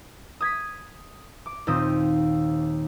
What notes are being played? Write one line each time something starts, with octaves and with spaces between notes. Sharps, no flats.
D#6 G#6 B6
D6
D#2 A#2 C4 D#6